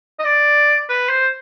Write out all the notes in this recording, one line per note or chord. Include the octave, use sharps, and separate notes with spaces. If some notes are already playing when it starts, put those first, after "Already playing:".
D#5
D5
B4
C5